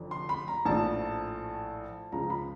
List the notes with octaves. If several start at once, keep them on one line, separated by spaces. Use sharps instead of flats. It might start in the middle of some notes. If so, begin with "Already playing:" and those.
Already playing: F1 F2 D3 F3
C6
B5
A#5
A#1 A2 F3 A5
C#2 C#3 F3 A#5
B5